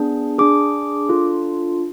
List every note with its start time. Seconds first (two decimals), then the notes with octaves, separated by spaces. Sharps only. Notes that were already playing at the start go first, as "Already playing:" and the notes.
Already playing: B3 D4 G#4
0.38 D4 G#4 D6
1.09 D4 F4 A4